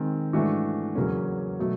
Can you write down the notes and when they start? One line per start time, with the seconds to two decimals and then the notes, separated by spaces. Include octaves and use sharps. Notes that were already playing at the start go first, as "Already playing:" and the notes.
Already playing: D#3 G#3 C4
0.33 G#2 E3 A3 D4 F#4
0.95 E2 C#3 F#3 A#3 C#4
1.59 B2 F#3 A3